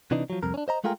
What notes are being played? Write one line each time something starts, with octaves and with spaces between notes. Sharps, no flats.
C3 E3 D4 D#4
F3 F#3
C2 F2 A#4
C#4 D4
C5 D#5 A#5
G#3 A3 F4 G#4 A#4 G5